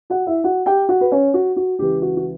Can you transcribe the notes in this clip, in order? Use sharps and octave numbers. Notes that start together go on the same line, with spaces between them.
F#4 F#5
E4 E5
F#4 F#5
G4 G5
F#4 F#5
B4
C#4 C#5
F#4
F#4
C#2 C#3 E3 G4
F#4
F#4